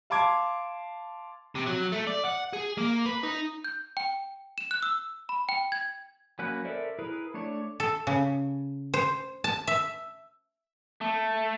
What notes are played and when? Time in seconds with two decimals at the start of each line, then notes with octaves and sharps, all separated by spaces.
0.10 F5 A5 C6 D6 G#6
1.55 C3
1.66 F#3
1.92 A3
2.07 D5
2.25 F#5
2.53 G#4
2.78 A#3
3.06 B4
3.23 D#4
3.64 G6
3.97 G5
4.58 E7
4.71 F#6
4.83 E6
5.29 B5
5.49 G5
5.72 G#6
6.39 F#3 A#3 C#4 B4 F#6
6.65 A4 A#4 C5 D5 E5
6.99 E4 G#4 A#4 B4
7.34 A3 D4 C#5
7.80 A4
8.07 C#3
8.94 C5
9.44 A5
9.67 E5
11.01 A3